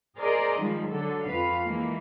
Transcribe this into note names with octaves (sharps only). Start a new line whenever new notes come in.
G#4 A#4 C5 D5 D#5
D#3 F3 G3 G#3
D3 F#3 A4
F2 B4 F5
E3 G#3 A#3